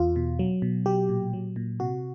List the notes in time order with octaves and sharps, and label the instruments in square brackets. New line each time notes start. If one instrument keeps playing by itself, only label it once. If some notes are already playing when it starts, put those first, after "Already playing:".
Already playing: [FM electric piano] E2 F4
B2
F#3
B2
F#3 G4
A#2
F#3
A#2
C3 F#4